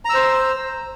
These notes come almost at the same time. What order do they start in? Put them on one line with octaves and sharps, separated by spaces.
A#5 E6 C5